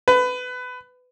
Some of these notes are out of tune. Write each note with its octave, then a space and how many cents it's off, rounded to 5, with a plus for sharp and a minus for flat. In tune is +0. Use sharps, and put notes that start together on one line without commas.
B4 +20